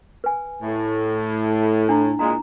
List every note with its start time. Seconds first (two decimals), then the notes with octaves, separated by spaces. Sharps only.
0.24 B4 G#5
0.62 A2
1.89 D4 E4
2.19 A#2 G#3 A#5